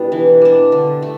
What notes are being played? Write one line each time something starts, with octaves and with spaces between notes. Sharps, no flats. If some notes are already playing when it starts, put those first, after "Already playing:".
Already playing: B2 G3 B3 D4 E4 G4
E3
G3 D4
D3
A3